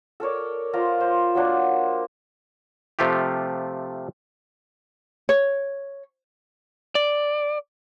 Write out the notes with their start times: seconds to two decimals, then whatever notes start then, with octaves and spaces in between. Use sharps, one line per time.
0.20 A4 A#4 C#5 D5
0.73 F4 C5 D5 A#5
1.00 C5
1.35 F#3 A#3 D4
2.99 C3 F3 A3 F4 G4
5.29 C#5
6.95 D5